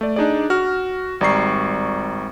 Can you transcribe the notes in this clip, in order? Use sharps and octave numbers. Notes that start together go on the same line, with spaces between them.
A3 D5
D4 D#4 G#4 D5
F#4 F6
G#1 G3 D5 A#5 C#6 C7